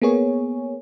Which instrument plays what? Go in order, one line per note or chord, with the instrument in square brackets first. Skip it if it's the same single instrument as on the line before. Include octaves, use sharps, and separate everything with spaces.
[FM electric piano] A#3 B3 G#4 C#5